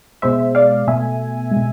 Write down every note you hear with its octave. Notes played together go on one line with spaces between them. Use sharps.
B2 G#3 C5 E5
D5 F5
B2 A3 E5 G#5
G#3
B2